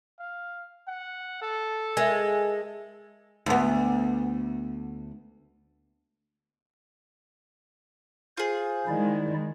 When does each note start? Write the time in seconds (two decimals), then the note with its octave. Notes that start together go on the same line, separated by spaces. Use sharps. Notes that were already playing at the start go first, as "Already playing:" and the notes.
0.20 F5
0.88 F#5
1.42 A4
1.97 G#3 A#4 E5
3.46 D2 B3
8.37 F4 G#4 C5
8.88 D#3 G#3 E4 D5